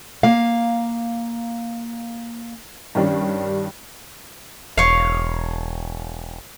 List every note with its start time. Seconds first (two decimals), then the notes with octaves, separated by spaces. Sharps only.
0.23 A#3 F5
2.95 G2 D#3 G3 C#4 D4
4.78 E1 C#5 F5